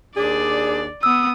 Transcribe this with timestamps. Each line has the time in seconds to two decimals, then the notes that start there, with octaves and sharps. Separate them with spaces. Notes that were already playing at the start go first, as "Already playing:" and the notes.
0.17 D#2 D4 G#4 D5
1.03 B3 D#6 E6